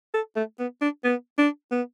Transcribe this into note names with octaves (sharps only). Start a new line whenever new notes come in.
A4
A3
B3
D4
B3
D4
B3